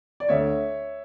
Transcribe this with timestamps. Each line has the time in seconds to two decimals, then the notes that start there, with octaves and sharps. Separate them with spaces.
0.20 D5
0.29 D2 C#5 E5